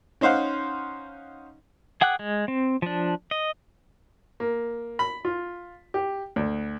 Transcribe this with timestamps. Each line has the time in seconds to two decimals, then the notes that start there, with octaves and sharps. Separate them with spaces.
0.21 C#4 D#4 C5 F5 F#5
2.01 G#4 F#5 G5 D6 F#6
2.19 G#3
2.48 C4
2.82 F3 D4
3.31 D#5
4.40 A#3
4.99 B5
5.25 F4
5.94 G4
6.36 D2